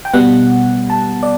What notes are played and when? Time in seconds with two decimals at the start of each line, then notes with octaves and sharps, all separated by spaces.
0.05 G5
0.13 B2 G3 B3 F#5
0.90 A5
1.23 D5